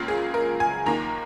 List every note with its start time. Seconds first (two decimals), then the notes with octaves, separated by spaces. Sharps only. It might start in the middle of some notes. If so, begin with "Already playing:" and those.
Already playing: C#2 C#3 A#3 F4
0.08 G#4
0.34 A#4
0.60 G#5
0.86 D#2 D#3 A#3 A#5